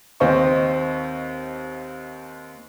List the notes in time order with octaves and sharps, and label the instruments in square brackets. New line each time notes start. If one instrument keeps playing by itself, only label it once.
[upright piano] D#2 C4 C5 D#5 C#6